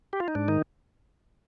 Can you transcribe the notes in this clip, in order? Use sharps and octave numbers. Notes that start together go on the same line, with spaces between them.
G4
F4
D#4
G#2 D4
D#3 D#4